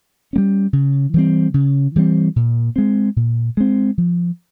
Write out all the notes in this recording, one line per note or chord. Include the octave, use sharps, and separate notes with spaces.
G3 A#3 C#4
C#3
E3 G3 C4
C#3
E3 G3 C4
A#2
G#3 C4
A#2
G#3 C4
F3